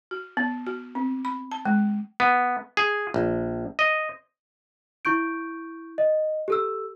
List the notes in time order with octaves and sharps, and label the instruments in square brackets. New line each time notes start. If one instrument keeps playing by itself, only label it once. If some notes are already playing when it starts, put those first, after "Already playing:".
[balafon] F#4
B3
F#4
C4
B5
A5
G#3
[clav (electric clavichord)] B3
G#4
A#1
D#5
[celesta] E4 C#6 G6 D7
D#5
G4 A4 E6